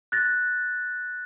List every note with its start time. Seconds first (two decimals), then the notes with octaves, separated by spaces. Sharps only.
0.12 F#6 A6 A#6